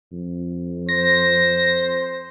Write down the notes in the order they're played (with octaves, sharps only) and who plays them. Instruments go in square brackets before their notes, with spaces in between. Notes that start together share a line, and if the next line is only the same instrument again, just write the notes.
[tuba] F2
[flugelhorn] C5 [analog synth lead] A#6